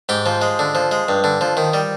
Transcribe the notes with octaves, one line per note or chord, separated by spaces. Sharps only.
G#2 G4
F3
G#3
D3
F3
G#3
G2
D3
F3
D#3
G3